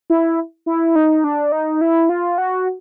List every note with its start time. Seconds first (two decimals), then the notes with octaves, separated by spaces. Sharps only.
0.10 E4
0.66 E4
0.96 D#4
1.24 D4
1.52 D#4
1.81 E4
2.09 F4
2.38 F#4